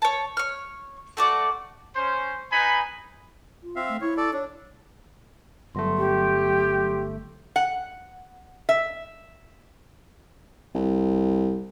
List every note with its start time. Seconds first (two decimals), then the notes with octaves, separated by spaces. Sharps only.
0.02 C#5 A5
0.37 C#5 F6
1.17 A3 F#4 D5
1.96 C#4 C5
2.52 D#4 B4 G#5 B5
3.63 F4
3.76 C4 E5 F5
3.89 A3
4.01 E4 C#5
4.17 A4 D5
4.33 D4 C#5
5.75 G1 F#3 A3 C6
5.98 G4
7.56 F#5
8.69 E5
10.75 C2